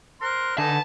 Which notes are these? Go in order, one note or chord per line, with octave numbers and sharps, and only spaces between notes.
A#4 C5 C6 F#6
D3 D#4 B4 F#5 G#5 A5